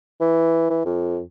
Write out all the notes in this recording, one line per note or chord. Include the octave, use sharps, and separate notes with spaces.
E3
E3
F2